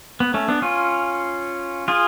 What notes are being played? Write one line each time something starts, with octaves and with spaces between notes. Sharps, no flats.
B3
A3 C#4
B3 D4
C#4 F4
F4 G#4